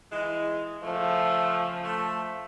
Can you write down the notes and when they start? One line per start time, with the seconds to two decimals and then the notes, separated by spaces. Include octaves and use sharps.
0.11 E3 G#3
0.83 C#3 F3 A3
1.84 A3